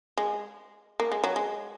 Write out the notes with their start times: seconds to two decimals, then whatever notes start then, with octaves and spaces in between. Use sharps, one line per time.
0.18 G#3
1.00 A#3
1.12 G#3
1.24 F#3
1.36 G#3